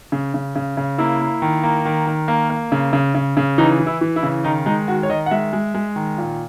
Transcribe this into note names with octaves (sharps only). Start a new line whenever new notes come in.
C#3
C#3
C#3
C#3
A#3 E4
A#3
D#3
A#3
D#3
D#3
A#3
A#3
C#3
C#3
C#3
C#3
E3 D#4
E3
E4
E3
E4
C#3
D#3 D#4
G#3 D#4
D#3 F#4
C#5
D#3 D#5
F#5
G#3 E5
G#3
G#3
D#3
A#2